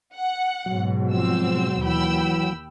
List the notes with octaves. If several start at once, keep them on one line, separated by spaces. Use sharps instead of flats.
F#5
G#2 B2 F#3
F3 C4 E6
D#2 E3 G5 B5 E6